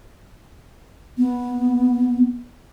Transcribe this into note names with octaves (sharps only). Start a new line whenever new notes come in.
B3